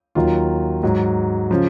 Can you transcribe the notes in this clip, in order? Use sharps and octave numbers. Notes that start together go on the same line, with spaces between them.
D#2 D#3 F#3 F4
G#2 F#3
C#3 F3